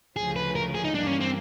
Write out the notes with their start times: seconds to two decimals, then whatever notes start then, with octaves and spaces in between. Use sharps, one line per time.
0.16 D2 C#3 F3 G#4
0.36 B4
0.55 A#4
0.75 G#4
0.84 D#4
0.94 G2 E3 G3 A#3 D4
1.07 C#4
1.21 C4